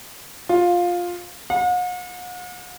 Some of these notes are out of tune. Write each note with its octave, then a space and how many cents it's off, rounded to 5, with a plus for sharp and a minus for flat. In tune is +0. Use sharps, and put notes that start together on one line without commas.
F4 +10
F#5 -45